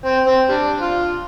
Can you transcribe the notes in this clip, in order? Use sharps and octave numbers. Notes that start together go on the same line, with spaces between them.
C4
C4
G3 D4
F4